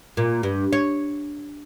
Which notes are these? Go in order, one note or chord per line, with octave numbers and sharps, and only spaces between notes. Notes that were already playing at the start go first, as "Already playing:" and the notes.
A#2
G2
C#5